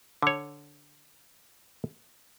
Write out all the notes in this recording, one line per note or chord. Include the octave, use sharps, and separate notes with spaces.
D3 C#5